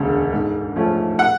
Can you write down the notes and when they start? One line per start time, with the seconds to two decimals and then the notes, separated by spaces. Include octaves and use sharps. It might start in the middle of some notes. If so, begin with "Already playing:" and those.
Already playing: E1 D2 C#3
0.33 G#2
0.76 F3 A3 C#4
1.19 F#5